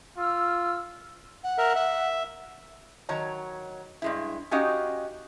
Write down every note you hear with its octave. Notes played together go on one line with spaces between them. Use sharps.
F4 E6 F6
F#5
A#4 E5
E5
D#3 F#3 C#5 A#5
G2 G#3 E4
C#4 D#4 F#4 G4 D#5 F5